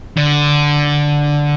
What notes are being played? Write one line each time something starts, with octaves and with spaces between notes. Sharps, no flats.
D3